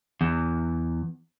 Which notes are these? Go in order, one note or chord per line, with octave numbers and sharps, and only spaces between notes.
E2